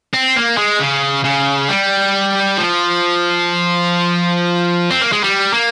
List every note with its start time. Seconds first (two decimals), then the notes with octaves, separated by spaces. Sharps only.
0.14 C4
0.37 A#3
0.58 G#3
0.80 C#3
1.24 C#3
1.69 G3
2.58 F3
4.91 C4
5.01 A#3
5.12 G#3
5.23 G3
5.53 A#3